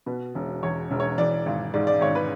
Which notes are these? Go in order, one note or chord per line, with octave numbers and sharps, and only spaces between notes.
B2 B4
E1
E2 C#5
E1
C#5
E3 D5
G#1
G#2 D5
D5
G#1 C#5
B4